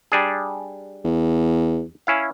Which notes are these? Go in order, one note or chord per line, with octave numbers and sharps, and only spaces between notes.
G3 D4 G#4
E2
C#4 E4 F5